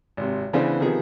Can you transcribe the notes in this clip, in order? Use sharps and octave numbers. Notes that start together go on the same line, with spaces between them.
G#1 C3
C#3 E3 B3 D4 C5
C3 D#3 F3 B3 G#4